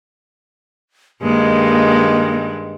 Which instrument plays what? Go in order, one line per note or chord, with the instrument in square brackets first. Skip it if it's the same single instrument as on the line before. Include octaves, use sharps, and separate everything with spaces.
[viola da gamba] G2 D#3 G#3 [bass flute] A#3